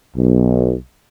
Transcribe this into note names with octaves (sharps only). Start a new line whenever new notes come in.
B1